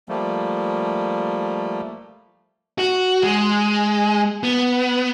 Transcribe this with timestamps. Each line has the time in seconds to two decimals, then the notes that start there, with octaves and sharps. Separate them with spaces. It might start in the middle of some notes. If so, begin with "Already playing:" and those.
0.09 F3 G3 A3 A#3
2.78 F#4
3.23 G#3
4.43 B3